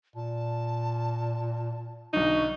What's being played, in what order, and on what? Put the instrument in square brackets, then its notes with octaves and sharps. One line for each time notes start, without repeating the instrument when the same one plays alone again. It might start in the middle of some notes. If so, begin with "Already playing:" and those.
[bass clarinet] A#2 [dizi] A5
[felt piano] B1 D3 [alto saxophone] D#4 [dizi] C#6